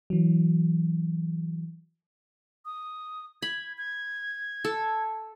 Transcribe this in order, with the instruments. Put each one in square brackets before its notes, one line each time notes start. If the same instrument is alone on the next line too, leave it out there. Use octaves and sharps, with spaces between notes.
[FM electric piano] E3 F#3
[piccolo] D#6
[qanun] B5 [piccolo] G#6
[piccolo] G#6
[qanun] A4